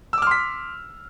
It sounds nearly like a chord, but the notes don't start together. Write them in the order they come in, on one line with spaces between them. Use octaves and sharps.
E6 D6 F6 C6 B6